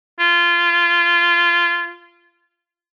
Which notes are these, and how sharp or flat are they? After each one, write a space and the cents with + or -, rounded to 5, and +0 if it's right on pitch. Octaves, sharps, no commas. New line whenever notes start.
F4 -20